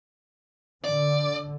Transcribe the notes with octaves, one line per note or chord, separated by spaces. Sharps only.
D3 D5